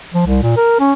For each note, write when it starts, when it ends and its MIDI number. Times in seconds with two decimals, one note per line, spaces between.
0.14 0.25 53
0.26 0.39 36
0.43 0.54 46
0.57 0.77 70
0.80 0.93 61